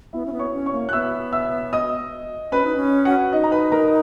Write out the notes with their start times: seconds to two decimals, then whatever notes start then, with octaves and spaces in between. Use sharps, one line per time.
0.13 B3 E4 E5
0.26 C#4
0.33 B3
0.39 C#5 C#6
0.54 C#4
0.66 C#5 C#6
0.73 A#3
0.89 F#6
0.93 B3 E5 E6
1.33 E5 E6
1.73 D#5 D#6
2.52 C#4 B4 B5
2.64 D#4
2.75 C#4
3.05 F#4 F#5
3.33 D#4 D#5
3.44 A#5
3.52 B4 B5
3.72 A#4 A#5